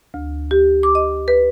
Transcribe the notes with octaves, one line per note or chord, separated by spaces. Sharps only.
D2
G4
D6
D#5
B4